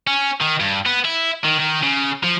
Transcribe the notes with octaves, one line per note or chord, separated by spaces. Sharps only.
C#4
D#3
G2
B3
E4
D#3
D#3
C#3
F3